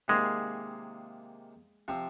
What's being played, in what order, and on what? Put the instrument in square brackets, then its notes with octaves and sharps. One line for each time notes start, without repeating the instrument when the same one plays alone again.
[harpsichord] C3 D#3 A#3 F4 G#4 [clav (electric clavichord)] G#3
[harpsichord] C3 F3 C4